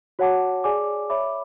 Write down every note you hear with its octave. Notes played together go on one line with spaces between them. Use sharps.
F#4 C#5 F#5 A5 D6
G#4 D5 G#5 D6
C#5 E5 B5 D6